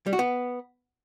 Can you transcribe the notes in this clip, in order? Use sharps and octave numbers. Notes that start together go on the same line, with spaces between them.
G3
F#4
B3